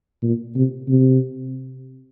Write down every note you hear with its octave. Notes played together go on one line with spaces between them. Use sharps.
A#2
C3
C3